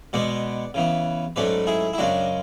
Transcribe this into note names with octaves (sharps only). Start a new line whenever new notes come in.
B2 G#3 B3 D5 F#5
C#3 E3 B3
G#2 F#3 A3 C#4 B4 D5
E4 G#4
E4
F#2 C#3 G#3 D4 F#4